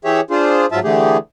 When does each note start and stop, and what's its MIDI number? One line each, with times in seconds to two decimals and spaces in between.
0.05 0.21 52
0.05 0.21 67
0.05 0.21 68
0.05 0.21 73
0.05 0.21 76
0.30 0.66 62
0.30 0.66 65
0.30 0.66 68
0.30 0.66 72
0.72 0.79 44
0.72 0.79 53
0.72 0.79 54
0.72 0.79 65
0.72 0.79 76
0.72 0.79 81
0.84 1.17 50
0.84 1.17 52
0.84 1.17 57
0.84 1.17 67
0.84 1.17 68